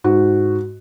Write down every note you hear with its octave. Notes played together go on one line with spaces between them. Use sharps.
G#2 F#4